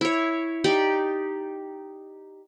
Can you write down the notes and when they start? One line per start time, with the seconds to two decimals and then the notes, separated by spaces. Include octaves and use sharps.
0.01 E4 C#5
0.64 D#4 G4 D5